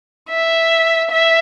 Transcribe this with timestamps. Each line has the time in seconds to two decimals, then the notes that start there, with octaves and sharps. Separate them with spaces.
0.29 E5
1.10 E5